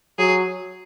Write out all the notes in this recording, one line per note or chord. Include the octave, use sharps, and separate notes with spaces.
F#3 G#4